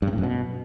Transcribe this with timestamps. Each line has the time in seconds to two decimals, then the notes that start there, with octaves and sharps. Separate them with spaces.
0.02 G2
0.07 C3
0.13 A2
0.18 F#2
0.23 B2